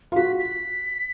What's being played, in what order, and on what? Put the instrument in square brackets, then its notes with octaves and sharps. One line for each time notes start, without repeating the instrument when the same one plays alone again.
[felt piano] F4
[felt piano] F#4 [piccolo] B6
[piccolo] B6